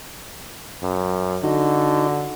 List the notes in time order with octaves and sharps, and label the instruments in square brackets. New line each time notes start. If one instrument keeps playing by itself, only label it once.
[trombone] F#2
[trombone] D3 [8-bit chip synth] D#4 F#4 D#5